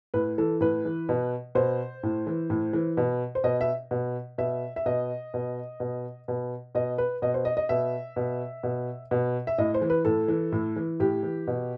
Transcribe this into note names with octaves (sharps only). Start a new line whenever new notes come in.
A2 B4
E3 A4
A2 B4
E3
B2
B2 C5
A2
E3
A2
E3
B2
C5
B2 D#5
E5
B2
B2 E5
E5
B2 D#5
B2
B2
B2
B2 D#5
B4
B2 D#5
C5
D#5
D#5
B2 E5
B2
B2
B2
E5
A2 D#5
C5
E3
B4
A2 A4
E3
A2
E3
A2 G4
E3
B2